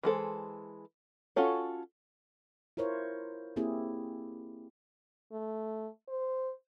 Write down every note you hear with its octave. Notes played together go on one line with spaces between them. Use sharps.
E3 G#3 A4 C5
C#4 F4 F#4 A4 C#5
E4 F4 A#4 C5 C#5
A#3 C4 E4 G4 G#4
A3
C5